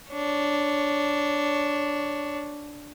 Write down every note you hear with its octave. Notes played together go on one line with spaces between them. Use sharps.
D4 C#5